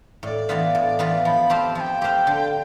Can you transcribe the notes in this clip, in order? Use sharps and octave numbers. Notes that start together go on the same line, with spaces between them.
A2 D5
E3 B3 F4 B4
A2
E3 B3 F4 B4
F3 B5
C4 G4 C5 F5 A5
F3 G5 A5
C4 G4 C5 F5
D3